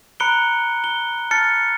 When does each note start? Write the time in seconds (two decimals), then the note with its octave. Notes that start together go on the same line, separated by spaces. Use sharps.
0.20 A#5 B5 F#6 C#7 D7 G7
0.84 G7
1.31 A5 F6 A6 C#7